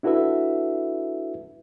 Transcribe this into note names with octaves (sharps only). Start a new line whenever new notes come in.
D4 E4 F#4 A4 B4 E5